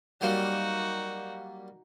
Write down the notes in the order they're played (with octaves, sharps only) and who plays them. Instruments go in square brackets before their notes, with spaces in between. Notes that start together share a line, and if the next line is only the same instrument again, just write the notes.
[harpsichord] F#3 G3 A#3 [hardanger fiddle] D#4 F#4